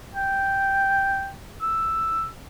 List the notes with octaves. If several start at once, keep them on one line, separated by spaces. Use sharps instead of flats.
G5
E6